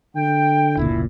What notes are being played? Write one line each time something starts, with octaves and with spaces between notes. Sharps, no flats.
D3 G5
F1 C#2 A#2 E4